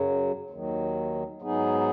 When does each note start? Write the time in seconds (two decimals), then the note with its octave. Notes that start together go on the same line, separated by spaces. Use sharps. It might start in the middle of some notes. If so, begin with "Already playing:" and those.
Already playing: F#2 C#3 F#3
0.50 D#2 D#3 F#3
1.42 G#2 F#3 B3 D#4 G#4